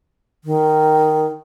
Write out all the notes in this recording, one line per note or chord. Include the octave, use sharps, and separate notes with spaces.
D#3